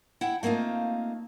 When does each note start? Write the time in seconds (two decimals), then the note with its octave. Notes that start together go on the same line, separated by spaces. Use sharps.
0.21 E4 F#5 G5
0.43 A3 A#3 C4 D#4 F4